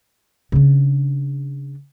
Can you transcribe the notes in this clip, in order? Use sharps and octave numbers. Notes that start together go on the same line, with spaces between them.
C#3 D4